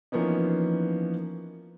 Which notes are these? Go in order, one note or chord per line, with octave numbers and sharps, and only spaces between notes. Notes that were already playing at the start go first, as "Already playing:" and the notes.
E3 F3 A#3 B3 C#4 D#4